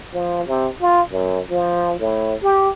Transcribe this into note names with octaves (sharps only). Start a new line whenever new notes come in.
F3
C3
F4
F#2
F3
A2
G4